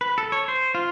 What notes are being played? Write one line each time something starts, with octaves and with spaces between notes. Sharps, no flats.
B4
A4
C#5
C5
F4